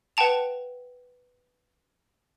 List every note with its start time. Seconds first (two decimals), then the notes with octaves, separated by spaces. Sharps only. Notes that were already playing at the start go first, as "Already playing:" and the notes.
0.17 B4 F#5 G5 A5 F7